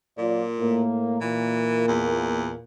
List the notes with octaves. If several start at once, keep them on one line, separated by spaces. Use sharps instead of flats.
A#2 F#3 F4 D5
A2 A#3
A#2 E3
E2